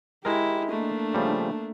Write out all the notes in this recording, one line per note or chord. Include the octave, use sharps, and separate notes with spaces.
G#3 E4 G4 A#4
A3 A#3 D4
C#3 F3 G3